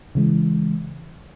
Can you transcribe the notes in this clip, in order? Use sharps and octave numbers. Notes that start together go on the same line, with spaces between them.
C#3 E3 G#3